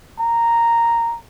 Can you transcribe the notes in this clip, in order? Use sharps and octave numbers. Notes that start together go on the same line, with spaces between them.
A#5